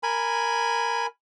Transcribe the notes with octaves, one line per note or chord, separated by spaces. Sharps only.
A#4 G#5 B5